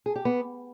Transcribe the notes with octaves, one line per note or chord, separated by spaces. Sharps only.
G#4
G4
B3